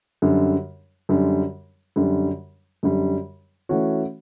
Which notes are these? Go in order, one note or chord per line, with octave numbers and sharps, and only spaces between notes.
F#2 D3 G3
F#2 D3 G3
F#2 D3 G3
F#2 D3 G3
E3 A3 C#4 F#4